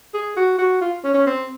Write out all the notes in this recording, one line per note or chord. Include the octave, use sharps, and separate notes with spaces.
G#4
F#4
F#4
F4
C#4
C#4
C4